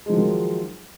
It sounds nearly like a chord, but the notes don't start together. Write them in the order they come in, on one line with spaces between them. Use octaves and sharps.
G#3 F3 F#3 D#3